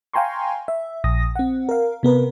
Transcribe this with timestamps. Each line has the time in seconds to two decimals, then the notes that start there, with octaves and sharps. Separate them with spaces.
0.13 F5 G5 G#5 A#5 C6 C#6
0.68 E5
1.04 A#1 D#6 A#6
1.36 C4 F#5
1.69 A#4 F5
2.03 C3 B3 A#4 B4